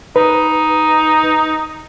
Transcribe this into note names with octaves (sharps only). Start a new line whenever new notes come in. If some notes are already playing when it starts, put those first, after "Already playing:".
D#4 B4